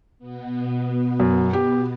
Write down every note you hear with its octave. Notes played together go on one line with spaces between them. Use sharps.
B2 B3
F#2
G4